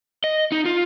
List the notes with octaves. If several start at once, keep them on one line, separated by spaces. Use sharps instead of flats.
D#5
D#4
F4